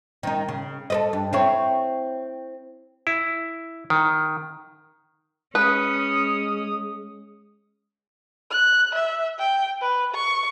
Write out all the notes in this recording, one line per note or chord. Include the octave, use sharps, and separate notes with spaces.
D#3 D#4
C#3
A4 B4 D#5
G2
C4 E4 C#5
E4
D#3
G#3 C#4 B4 D#6
F#6
E5
G5
B4
C#6